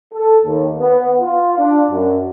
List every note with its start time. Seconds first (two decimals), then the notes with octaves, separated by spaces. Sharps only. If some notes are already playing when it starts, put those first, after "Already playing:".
0.14 A4
0.45 D#2
0.79 B3
1.20 F4
1.58 D4
1.91 F#2